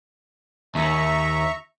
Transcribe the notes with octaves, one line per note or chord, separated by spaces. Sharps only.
D#2 E5 A#5 C#6